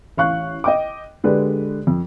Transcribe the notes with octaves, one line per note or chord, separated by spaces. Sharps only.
A1 F5 C#6 F#6
D#5 G5 D6
D3 G#3 G4 B4 D5
F2